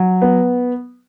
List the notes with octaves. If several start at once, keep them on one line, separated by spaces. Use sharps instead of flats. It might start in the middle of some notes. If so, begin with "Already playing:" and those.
Already playing: F#3
B3